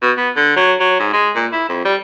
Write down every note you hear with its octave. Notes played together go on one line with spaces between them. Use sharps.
B2
B3
D3
F#3
F#3
G#2
G#3
A#2
E4
F2
G3